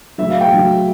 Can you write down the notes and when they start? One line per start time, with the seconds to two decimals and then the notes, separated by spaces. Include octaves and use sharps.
0.18 F#3 E5
0.22 A2
0.30 F5
0.41 G5
0.52 A2 F#3